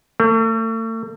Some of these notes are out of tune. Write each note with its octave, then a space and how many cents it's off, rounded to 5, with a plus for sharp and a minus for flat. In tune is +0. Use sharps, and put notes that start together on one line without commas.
A3 +40